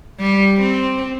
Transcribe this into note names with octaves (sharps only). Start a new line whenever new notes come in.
G3
C4